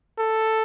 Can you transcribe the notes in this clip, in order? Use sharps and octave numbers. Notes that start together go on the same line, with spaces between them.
A4